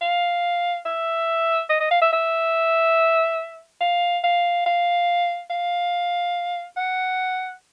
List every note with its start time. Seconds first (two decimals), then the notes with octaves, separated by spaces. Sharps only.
0.01 F5
0.85 E5
1.69 D#5
1.80 D#5
1.91 F5
2.01 E5
2.12 E5
3.81 F5
4.23 F5
4.66 F5
5.50 F5
6.77 F#5